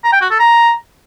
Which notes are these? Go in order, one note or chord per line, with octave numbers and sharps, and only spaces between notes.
A#5
G5
F#4
A4
A#5